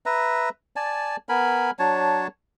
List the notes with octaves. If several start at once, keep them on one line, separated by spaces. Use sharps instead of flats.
B4 E5 A#5
D5 G#5 A5
B3 A#4 G#5 B5
F#3 D4 C#5 A5